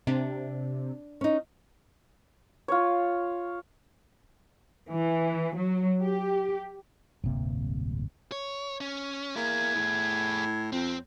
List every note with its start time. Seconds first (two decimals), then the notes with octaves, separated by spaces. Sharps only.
0.07 C3 D4
1.21 C#4 D#4
2.68 F4 C#5
4.90 E3
5.56 F#3
6.01 G4
7.24 D1 G1 C3 A#3
8.32 C#5
8.81 C#4
9.36 A#3 E4 G#4 G#6
9.75 A2
10.73 F2 C4